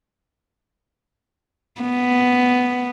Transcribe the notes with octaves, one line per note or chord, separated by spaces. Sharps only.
B3